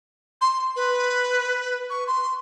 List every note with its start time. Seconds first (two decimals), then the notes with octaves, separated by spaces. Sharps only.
0.41 C6
0.76 B4
1.90 C#6
2.07 C6